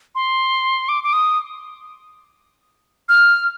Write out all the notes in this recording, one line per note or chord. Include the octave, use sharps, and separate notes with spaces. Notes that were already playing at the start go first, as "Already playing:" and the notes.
C6
D6
D6
D#6
F6